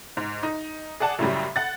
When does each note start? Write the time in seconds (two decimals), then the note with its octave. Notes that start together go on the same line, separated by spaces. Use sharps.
0.17 G#2
0.43 D#4
1.00 G#4 D5 F#5 A5
1.19 F#2 A2 C#3 F#3 G3
1.56 F#5 A6